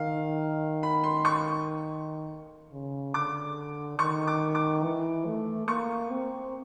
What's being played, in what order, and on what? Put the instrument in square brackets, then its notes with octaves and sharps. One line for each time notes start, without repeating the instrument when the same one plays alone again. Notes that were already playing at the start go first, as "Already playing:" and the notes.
Already playing: [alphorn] D#3 [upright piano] F5
[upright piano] B5
C6
C#6
[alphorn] C#3
[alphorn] D3 [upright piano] D6
[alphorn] D#3 [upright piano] C#6
[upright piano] D6
D6
[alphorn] E3
A3
[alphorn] A#3 [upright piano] C#6
[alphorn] C4